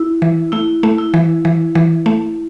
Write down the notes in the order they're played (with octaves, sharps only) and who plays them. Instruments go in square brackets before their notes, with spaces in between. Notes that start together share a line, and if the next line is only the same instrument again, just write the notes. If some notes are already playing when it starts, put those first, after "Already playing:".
Already playing: [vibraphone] E4
[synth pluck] E3
[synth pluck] A3 [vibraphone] E4
[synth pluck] A3
[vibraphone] E4
[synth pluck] E3
E3
E3
A3